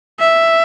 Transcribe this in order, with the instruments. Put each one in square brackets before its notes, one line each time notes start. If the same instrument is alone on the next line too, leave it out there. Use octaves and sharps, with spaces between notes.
[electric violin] E5